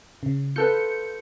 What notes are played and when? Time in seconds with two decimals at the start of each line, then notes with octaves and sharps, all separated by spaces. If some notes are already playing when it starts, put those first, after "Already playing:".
0.23 C#3
0.56 F4 A4 B4 G6 C#7